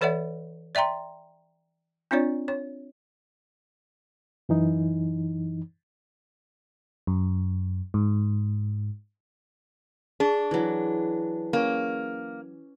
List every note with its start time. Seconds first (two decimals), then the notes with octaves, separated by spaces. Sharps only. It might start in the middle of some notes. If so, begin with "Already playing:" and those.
0.01 E3 A4 C#5 D5 E5 F#5
0.75 D5 E5 G5 A#5 C6
2.11 C4 D4 F4 C#5 D5
2.48 C#5
4.49 F#2 E3 D#4
7.07 F#2
7.94 G#2
10.20 D4 G#4
10.51 E3 F#3
11.53 A#3 C#4